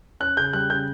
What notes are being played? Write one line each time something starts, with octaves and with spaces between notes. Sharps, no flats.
C#4 F#6
C#3 G6
G3 F#6
C#3 G6